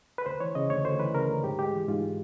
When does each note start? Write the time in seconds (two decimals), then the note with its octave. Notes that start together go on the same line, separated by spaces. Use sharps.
0.18 B4
0.26 D2 C5
0.40 E3 C#5
0.55 C#3 D#5
0.70 D2 C#5
0.85 D2 C5
1.00 E3 B4
1.15 C#3 A#4
1.29 D2
1.44 G#2 G4
1.59 G#3 G4
1.73 E3
1.88 G#2 F4